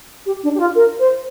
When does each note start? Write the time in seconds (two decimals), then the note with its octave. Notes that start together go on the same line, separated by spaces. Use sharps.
0.26 G4
0.43 D4
0.55 G4
0.60 F4
0.75 A#4
0.99 C5